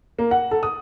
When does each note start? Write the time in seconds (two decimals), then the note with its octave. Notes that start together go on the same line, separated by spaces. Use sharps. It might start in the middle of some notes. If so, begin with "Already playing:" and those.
0.19 A#3
0.31 F#5
0.51 A4
0.63 D#6